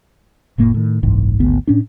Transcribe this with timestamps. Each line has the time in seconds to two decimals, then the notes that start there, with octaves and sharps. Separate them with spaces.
0.58 F1 A2 A#3
0.74 A2 D#3
1.03 F#1 C2 G#2 E3
1.40 G#1 D2 B3
1.67 A2 C#4 D4